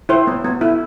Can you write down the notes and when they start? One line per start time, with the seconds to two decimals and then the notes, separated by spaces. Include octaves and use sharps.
0.09 E4 C5
0.27 B3
0.45 B3
0.61 E4